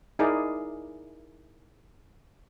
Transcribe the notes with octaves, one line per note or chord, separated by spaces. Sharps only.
D#4 E4 G#4 A#4 D5